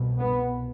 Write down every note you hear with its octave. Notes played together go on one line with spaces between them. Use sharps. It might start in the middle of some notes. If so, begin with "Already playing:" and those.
Already playing: C2 B2
B3